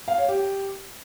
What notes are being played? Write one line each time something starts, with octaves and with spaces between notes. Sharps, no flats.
F5
C#5
G4